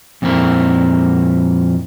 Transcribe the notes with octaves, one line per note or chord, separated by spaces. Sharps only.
F2 A#2 C4 E4 A#4